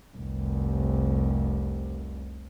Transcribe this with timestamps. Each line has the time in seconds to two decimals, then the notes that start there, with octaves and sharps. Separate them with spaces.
0.17 F1 C2